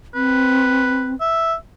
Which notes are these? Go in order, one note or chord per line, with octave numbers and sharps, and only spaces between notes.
C4 B4
E5